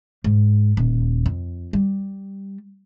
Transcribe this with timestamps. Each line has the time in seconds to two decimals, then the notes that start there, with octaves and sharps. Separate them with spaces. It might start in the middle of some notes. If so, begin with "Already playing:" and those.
0.24 G#2
0.77 D#1
1.26 F2
1.73 G3